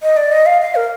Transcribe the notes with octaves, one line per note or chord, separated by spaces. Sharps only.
D#5
D5
D#5
F5
F5
A#4